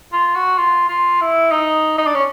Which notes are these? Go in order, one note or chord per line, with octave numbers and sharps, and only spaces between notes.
F4
F#4
F4
F4
E4
D#4
D#4
D4
C#4